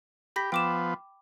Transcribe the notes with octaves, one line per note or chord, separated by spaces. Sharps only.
G4 B5 A#6 B6
F3 B3 G5 D6 E7